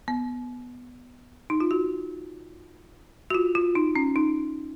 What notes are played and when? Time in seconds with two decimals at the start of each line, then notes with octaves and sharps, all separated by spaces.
0.08 B3
1.50 D#4
1.60 F4
1.71 F#4
3.30 F#4
3.34 F4
3.55 F4
3.75 D#4
3.96 C#4
4.16 D#4